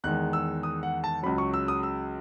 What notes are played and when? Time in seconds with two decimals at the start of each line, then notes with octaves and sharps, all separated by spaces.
0.04 E2 D#3 G#3 F#6
0.33 E6
0.63 D#6
0.83 F#5
1.04 A5
1.23 C#2 C#3 F#3 B5
1.38 C#6
1.54 E6
1.68 D#6
1.83 E6